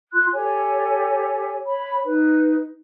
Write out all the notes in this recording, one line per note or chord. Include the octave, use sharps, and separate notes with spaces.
F4 C6 F#6
G4 A4 C#5 G#5
C#5 B5
D#4 B4